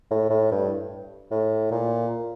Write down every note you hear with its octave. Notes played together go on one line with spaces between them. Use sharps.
A2
A2
G2
A2
A#2